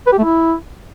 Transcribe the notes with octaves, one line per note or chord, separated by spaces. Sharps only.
B4
G4
A3
E4